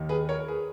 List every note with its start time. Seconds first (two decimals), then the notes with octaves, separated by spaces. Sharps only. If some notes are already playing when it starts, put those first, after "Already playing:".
Already playing: D#2 D#3
0.09 G#4 B4
0.29 A#4 C#5
0.39 A#4
0.48 G#4 B4